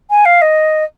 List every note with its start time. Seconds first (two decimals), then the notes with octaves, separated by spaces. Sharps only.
0.10 G#5
0.25 F5
0.41 D#5